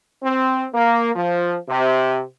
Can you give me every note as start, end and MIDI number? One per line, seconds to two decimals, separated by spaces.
0.22 0.67 60
0.73 1.11 58
1.14 1.55 53
1.68 2.24 48